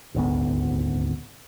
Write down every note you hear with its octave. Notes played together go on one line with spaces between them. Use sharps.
D#1 G#1 D2 B3